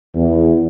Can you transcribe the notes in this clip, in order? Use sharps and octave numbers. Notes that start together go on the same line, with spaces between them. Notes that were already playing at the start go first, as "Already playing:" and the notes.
E2